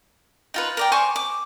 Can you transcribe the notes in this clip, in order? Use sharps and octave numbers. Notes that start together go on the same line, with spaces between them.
D#4 F4 B4
A#4 D5 G5
C5 G#5 C#6 D6
D6